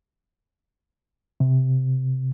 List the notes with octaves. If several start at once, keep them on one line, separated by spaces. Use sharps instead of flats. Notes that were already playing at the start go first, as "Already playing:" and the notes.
C3